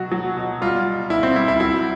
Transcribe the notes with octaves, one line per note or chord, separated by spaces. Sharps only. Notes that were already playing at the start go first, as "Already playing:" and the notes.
Already playing: B2 F#3 F#4
F#3
B2
G3 F4
B2
B2 E4
C4
G3 E4
E4
F#3 E4